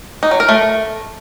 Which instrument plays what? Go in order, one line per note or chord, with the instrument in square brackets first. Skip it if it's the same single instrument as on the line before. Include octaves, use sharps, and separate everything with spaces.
[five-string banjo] D#4
F#3
A#4
A3